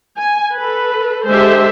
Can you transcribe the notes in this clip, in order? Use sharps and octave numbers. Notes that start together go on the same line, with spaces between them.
G#5
A4 B4
D3 G#3 G4 A4 C5 E5